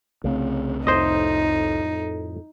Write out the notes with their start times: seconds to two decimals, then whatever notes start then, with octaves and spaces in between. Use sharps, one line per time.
0.24 C2 C#3 A3 C4
0.87 F2 A2 D#4 C5 D#5